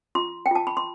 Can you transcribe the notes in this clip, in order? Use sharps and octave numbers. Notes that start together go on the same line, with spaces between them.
F4 C6
G5
F4 A5
B5
C6